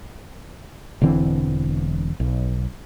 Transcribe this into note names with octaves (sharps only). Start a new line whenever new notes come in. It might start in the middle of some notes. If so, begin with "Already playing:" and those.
E1 D3 E3 C4
B1